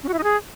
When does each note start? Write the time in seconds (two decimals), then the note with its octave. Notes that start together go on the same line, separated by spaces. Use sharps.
0.03 C#4
0.08 F#4
0.13 E4
0.18 D#4
0.23 G#4